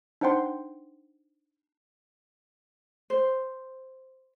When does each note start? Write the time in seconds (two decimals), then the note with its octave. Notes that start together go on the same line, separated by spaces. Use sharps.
0.21 D4 D#4 C5 F#5 G5 C6
3.10 C5